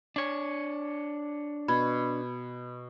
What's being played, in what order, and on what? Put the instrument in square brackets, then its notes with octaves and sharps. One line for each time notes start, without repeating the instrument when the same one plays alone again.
[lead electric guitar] D4 C#5
[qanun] B2 [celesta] B5 G#6